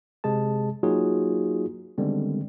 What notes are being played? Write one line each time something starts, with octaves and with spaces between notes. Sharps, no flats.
C3 G#3 G#4 A5
F#3 A#3 D#4 F4 F#4 G#4
D3 D#3 G3 G#3 B3 C4